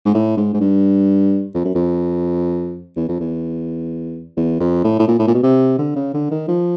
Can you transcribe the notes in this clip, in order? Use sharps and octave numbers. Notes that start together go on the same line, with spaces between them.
G#2
A2
G#2
G#2
G2
F2
F#2
F2
E2
F2
E2
E2
F2
A2
A2
A#2
A2
A#2
B2
C3
D3
C#3
D3
D#3
F3